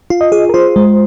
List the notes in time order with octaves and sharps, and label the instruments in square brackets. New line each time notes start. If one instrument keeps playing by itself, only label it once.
[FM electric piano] F4
[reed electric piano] D#5
[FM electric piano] G#4
[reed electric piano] A#4
[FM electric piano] F4 [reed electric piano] C5
[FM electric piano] G#3